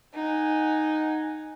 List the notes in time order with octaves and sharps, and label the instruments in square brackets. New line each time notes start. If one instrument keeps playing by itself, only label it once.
[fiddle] D#4 [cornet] F#5 [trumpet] G#5